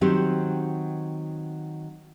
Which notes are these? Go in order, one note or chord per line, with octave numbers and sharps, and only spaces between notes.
D#3 F#3 C4 G4 C5